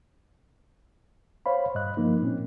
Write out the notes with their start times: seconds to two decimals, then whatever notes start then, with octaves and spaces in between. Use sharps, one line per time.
1.46 C5 C#5 F5 B5
1.75 G2 D#5 F#6
1.97 F3 A#3 D#4
2.22 A#2 C4 C#4